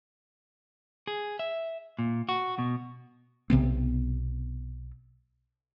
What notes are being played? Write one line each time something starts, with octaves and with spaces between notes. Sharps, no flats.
G#4
E5
A#2
F#4
B2
B1 C3 B3 C4